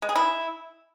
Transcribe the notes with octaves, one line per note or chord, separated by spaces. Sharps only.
G#3
G#4
E4